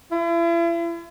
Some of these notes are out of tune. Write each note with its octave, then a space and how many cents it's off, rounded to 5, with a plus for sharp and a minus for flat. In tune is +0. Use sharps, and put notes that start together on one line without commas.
E4 +40